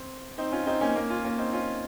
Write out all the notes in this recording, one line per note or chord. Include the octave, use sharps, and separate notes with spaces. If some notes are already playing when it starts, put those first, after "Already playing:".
Already playing: C4
C4 D#4
C#4 F4
C4 D#4
A#3 C#4
A#3 C#4
C#4 F4
A#3 C#4
C4 D#4
C#4 F4